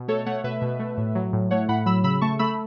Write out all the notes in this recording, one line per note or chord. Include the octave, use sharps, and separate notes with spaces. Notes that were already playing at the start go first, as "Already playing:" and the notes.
Already playing: B2
A3 A4 C#5
A3 C#5 F#5
B2 B4 E5
B2
A3
A2
F#3
A2
A3 C#5 F#5
A2 F#5 B5
F#3 B5 E6
C#3 B5 E6
A3 A5 C#6
A3 B5 E6